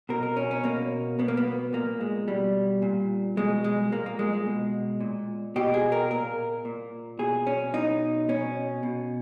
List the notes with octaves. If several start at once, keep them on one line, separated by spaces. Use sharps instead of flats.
B2 A#4
A#4
C#4
C#4
B2 A#3
B2 B3
A#3
B3
A#2 A#3
G#3
B2 G3
A#2
B2 G#3
G#3
A#2 A#3
A#3
G#3
G#3
B2
A#2
B2 G4
G#4
A#4
A#2 A#4
A#2
B2 G#4
C#4
B2 D#4
B2 C#4
B2